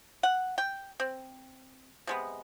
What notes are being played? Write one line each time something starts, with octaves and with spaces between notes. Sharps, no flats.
F#5
G5
C4
C3 G#3 B3